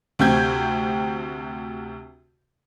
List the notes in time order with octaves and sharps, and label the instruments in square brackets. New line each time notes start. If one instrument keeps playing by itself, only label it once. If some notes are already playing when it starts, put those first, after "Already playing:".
[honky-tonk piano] D2 C3 C4 G4 G6 G#6